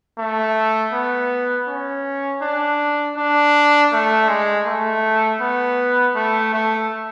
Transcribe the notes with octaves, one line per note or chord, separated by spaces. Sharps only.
A3
B3
C#4
D4
D4
A3
G#3
A3
B3
A3
A3